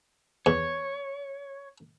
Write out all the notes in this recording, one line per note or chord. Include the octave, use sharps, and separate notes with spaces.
E2 C#5